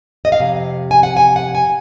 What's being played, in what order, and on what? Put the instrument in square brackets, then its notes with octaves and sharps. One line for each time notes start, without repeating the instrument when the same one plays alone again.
[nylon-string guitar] D#5
F5
F2 C3
G#5
F#5
G#5
F#5
G#5